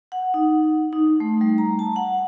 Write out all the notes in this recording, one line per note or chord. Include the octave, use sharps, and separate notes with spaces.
F#5
D#4
D#4
A3
G3
A#5
A5
F#5